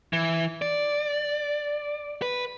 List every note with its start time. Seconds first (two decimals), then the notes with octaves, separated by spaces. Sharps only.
0.13 E3
0.62 D5
2.22 B4